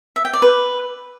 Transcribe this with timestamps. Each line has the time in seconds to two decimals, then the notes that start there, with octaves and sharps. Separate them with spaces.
0.16 E5
0.25 G5
0.33 D5
0.42 B4